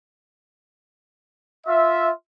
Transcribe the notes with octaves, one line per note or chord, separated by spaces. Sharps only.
F4 E5